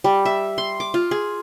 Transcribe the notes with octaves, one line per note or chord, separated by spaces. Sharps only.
G3
E5
C6
D6
F4
G#4